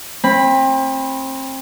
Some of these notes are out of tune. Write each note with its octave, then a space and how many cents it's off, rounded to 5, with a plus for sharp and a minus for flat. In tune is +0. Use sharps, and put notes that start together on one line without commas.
C4 +30 B5 +0